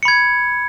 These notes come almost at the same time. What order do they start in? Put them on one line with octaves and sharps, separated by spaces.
C#7 B5 G#6